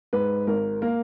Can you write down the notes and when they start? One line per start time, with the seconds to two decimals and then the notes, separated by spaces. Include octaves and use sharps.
0.13 G#2 B4
0.47 G#1 A#4
0.82 A#3 A#4